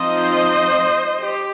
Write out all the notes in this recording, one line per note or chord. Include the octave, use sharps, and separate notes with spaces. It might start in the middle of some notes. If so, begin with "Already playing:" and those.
Already playing: F3 C4 D#4 C5 D#5
G4